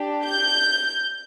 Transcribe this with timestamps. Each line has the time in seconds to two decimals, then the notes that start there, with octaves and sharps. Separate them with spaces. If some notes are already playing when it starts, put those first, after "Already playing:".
Already playing: D4 G4
0.24 G6